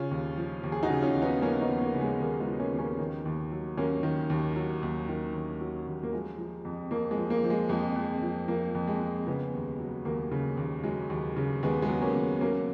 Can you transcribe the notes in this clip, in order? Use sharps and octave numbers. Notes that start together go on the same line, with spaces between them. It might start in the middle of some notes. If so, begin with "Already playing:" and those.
Already playing: C#3 C#4 F4
D#2
F3
D#2
G#4
D#4 F#4
C#3
C#4 F4
D#2
B3 D#4
F3 A#3 C#4
B3 D#4
D#2
A#3
C#3
G#3
D#2 A#3
G#3 B3
F3
A#3 C#4
D#2
A#3 C#4
D#3
D#2
F#3
D#2 A#3 C#4
D#3
D#2
F#3
D#2
D#3
D#2
F#3
D#2
A#3
F3 G#3
F3
F2
F2 A#3
G#3
F3
A#3
F3
G#3
F2 G#3
F2
F3
F3 A#3
F2
G#3
F2
C#3 G#3 B3
D#2
F#3
D#2 A#3
C#3
D#2
F#3 G#3
D#2
C#3
D#2 G#3 B3
G#3 B3
F#3
A#3 C#4
D#2
F#3 A#3 C#4